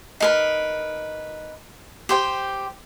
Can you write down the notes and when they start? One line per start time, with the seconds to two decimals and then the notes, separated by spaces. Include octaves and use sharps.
0.20 D#4 A#4 B4
2.09 G4 C5 G5